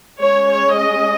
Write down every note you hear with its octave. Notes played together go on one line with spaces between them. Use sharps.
G#3 C#4 C#5
C#5
D#5